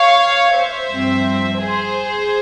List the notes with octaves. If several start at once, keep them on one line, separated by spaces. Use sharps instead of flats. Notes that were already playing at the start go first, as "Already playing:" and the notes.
Already playing: C#5 F5
C5 E5
G2 F3 C4
G#4 C5